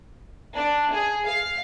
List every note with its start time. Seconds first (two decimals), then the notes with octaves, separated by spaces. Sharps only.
0.56 D4
0.92 G#4
1.27 F5